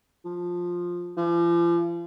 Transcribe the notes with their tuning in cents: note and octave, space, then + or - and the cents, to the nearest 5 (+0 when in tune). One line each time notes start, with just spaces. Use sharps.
F3 +10
F3 -40